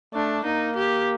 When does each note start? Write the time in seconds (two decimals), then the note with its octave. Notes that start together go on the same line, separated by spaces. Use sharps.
0.14 A3 D4
0.44 A#3 D#4
0.75 G4